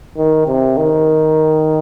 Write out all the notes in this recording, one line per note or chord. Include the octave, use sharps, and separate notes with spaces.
D#3
C3
D#3